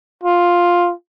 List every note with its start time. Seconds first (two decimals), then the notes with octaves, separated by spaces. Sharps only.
0.23 F4